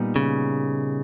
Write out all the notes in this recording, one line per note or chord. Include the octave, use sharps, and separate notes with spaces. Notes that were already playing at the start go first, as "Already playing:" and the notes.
Already playing: A#2 G3 B3 D#4
C#3